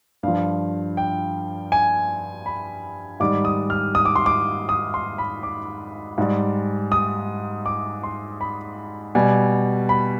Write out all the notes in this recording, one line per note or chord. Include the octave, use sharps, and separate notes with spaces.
G2 F3 F5
G5
G#5
B5
G#2 D#3 G3 D6
D#6
F6
D#6
D6
C6
D6
D#6
C6
B5
D6
G#2 G3
D#6
D6
C6
B5
B2 G3 G#5
B5